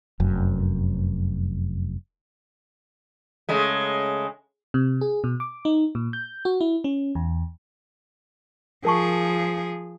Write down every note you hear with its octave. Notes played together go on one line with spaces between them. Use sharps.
F1 F#2
C#3 G#3 A3
C3
G#4
B2
D6
D#4
A#2
G6
F#4
E4
C#4
E2
F3 G#4 A#4 A5 C#6